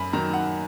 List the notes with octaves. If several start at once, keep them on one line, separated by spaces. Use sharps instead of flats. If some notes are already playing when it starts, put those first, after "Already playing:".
Already playing: F#2 B5
D#3 F#3 A#5
F#5